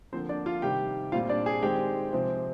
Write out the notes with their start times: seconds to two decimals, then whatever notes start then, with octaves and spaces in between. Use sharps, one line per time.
0.13 D3 F3 A#3 C4 C5
0.29 D4 D5
0.46 F4 F5
0.62 C3 D#3 G3 G4 G5
1.12 A#2 G3 C4 F4 F5
1.29 D4 D5
1.46 G#4
1.62 D#3 G#3 C4 G4 G5
2.13 C3 F3 G#3 C4